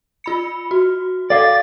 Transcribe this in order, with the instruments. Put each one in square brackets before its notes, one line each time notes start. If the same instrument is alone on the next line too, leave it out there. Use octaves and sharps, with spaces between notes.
[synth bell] F4 B5 C#7
F#4
[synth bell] A4 [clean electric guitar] D5 F5 [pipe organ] D6 A6